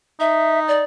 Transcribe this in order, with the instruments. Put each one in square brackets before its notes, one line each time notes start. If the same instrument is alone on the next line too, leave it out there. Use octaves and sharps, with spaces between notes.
[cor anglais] D#4 [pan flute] E5
[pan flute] D5